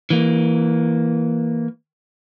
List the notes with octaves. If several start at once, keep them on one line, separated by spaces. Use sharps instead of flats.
E3 A#3